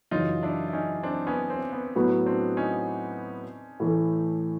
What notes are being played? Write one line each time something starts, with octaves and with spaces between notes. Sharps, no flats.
F#2 C#3 E3 D#4 F4
D4 E4
E4
C#4 D#4
C4 D4
B3 C#4
C4
B3
A2 F#3 B3
C4 D4
C#4 D#4
A2 E3 A3